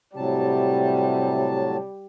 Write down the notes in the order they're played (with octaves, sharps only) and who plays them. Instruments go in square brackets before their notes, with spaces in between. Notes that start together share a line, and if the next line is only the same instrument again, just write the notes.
[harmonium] A2 F#3 A5 [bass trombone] C3 [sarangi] G3